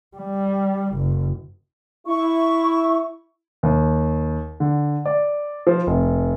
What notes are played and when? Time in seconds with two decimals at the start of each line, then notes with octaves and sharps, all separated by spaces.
0.17 G3
0.94 F#1
2.07 E4 C#6
3.63 D#2
4.60 D3
5.06 D5
5.67 F3
5.87 F1